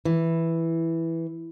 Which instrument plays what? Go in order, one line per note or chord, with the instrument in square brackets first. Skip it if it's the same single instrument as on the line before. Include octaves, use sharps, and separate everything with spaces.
[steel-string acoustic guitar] E3